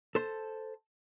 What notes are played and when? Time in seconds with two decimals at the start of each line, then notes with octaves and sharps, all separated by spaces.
0.15 A4 C5